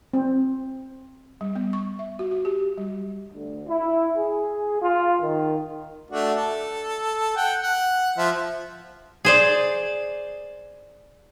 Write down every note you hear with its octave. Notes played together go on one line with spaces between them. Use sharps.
C4
G3
B3
C#6
E5
F#4
F#4
G4
G3
D2
E4
G#4
F4
D#3
A3 D4 F#4
A4
F#5 G5
F#5
F3 E5
G#4 C5 D5